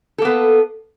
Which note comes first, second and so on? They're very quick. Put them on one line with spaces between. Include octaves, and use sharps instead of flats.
A4 A#3 B3